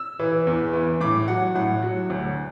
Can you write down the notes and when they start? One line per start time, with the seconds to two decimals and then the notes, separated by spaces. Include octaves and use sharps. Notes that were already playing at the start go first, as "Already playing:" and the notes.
Already playing: E6
0.19 E3
0.47 E2
0.73 E3
1.01 A2 D6
1.28 F#3 F#5
1.55 A2 F#5
1.82 F#3
2.10 D2